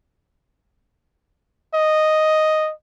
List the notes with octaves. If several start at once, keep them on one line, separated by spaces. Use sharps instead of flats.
D#5